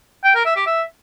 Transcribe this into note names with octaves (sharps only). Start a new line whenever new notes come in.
G5
A#4
E5
G4
E5